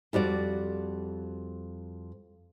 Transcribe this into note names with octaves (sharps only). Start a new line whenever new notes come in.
F2 G3 F#4 D5